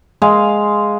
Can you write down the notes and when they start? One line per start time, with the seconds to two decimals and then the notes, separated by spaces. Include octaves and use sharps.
0.22 G#3 F5 G#5